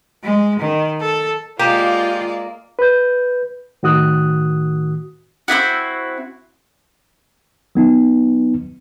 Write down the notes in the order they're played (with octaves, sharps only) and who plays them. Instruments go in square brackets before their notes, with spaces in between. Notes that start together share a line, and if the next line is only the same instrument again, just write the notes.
[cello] G#3
D#3
A4
[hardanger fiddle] G#3 D5 [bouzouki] A#3 [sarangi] F4 [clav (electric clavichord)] G4
[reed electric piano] B4 G6
A2 D#3 F#4 D#6 F#6
[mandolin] C4 D#4 E4 F#4
[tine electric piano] F#3 B3 D#4